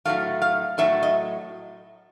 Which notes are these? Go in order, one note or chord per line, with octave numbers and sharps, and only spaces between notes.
A2 F#3 A3 F5
F5
A2 F#3 A3 E5
D#5